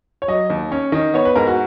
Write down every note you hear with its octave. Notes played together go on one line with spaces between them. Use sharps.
C#5
F#3 D#5
D#2
C#4
D#3 D#5
B3 C#5
B4
G#2 A#4
F#4